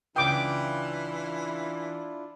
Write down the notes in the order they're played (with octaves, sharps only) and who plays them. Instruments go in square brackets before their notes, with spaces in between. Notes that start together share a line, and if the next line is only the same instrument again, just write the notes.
[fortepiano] C#2 D#6 [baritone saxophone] E3 [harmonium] D4 E4 F4 [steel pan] G5 D6